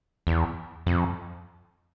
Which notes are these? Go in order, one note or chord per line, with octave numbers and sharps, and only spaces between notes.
E2
F2